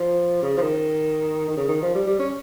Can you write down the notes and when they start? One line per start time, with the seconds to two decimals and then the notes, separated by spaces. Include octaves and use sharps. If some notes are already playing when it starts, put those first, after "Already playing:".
Already playing: F3
0.42 C#3
0.57 F3
0.61 D#3
1.49 D#3
1.57 C#3
1.68 D#3
1.82 F3
1.94 G3
2.07 G3
2.19 C#4